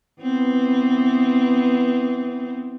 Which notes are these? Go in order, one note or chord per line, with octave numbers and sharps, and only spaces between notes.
E3 B3 C4